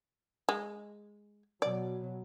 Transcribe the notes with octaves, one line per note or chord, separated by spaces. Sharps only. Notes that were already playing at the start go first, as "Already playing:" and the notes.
G#3
B2 F#3 D5